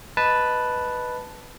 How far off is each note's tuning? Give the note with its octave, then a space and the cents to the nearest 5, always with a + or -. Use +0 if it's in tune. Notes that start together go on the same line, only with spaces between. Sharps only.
B4 +0 D#5 +0 A5 +0